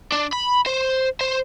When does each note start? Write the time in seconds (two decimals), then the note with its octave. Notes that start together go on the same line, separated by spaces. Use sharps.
0.12 D4
0.33 B5
0.66 C5
1.21 C5